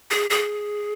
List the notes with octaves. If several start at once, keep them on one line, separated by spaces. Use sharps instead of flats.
G#4
G#4